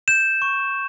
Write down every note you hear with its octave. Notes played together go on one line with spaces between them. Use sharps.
G6 E7
C#6